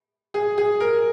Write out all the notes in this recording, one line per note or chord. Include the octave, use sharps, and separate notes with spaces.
G#4
G#4
A#4